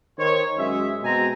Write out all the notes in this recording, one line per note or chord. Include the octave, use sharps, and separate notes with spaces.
D#3 C5 C#5
F#2 G#3 G#4 E5
B2 G#3 C4 G#5 A#5